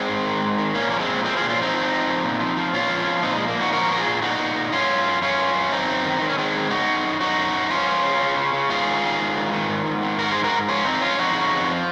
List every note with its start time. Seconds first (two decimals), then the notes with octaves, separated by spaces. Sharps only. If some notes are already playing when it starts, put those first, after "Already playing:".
Already playing: G#3 C4
0.08 G#2
0.25 D#3
0.42 G#2
0.58 D#3
0.75 A#2 A#3 C#4
0.90 F3 A#3
1.00 G#3 C4
1.08 A#2
1.24 F3 G#3 C4
1.37 F4 G#4
1.41 A#2
1.49 C#4 F4
1.57 F3 C4 D#4
1.74 F3
1.91 F3
2.07 F3
2.24 A#2
2.40 F3
2.57 F3
2.73 A#2 C#4 F4
2.90 F3
3.07 F3
3.23 A#2 C4 D#4
3.35 F3 G#3
3.48 A#3
3.56 A#2 D#4 F#4
3.73 F3 F#4 A#4
3.90 A#2 A#4
3.97 F4 G#4
4.06 A#2
4.22 A#2 D#4 F#4
4.39 A#2
4.55 A#2
4.72 F#2 C#4 F4
4.89 F#2
5.05 F#2
5.22 F#2 C#4 F4
5.38 F#2
5.55 F#2
5.71 F#2 C4 D#4
5.88 F#2
6.05 D#3
6.21 D#3 C4
6.30 C#4
6.38 D#3 G#3 C4
6.54 F#2
6.71 C#3 D#4 F#4
6.88 F#2
7.04 F#2
7.21 F#2 D#4 F#4
7.37 F#2
7.54 F#2
7.70 F3 C#4 F4
7.87 F3
8.03 C#3
8.20 C#3
8.37 C#3
8.53 C#3
8.69 G#2 F4 G#4
8.86 D#3
9.03 D#3
9.20 G#2
9.36 D#3
9.53 D#3
9.69 G#2
9.86 G#2
10.03 D#3
10.19 G#2 F#4 A#4
10.31 G#2 G#4 C5
10.44 F#4 A#4
10.53 G#2
10.69 F3 C#4 F4
10.85 F2 C4 D#4
11.01 F2 C#4 F4
11.18 F2 D#4 F#4
11.34 C#3
11.51 F2
11.68 F3